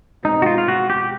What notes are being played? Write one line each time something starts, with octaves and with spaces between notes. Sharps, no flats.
B2 G#3 C4 D#4
F#4
F4
F4
F#4
G4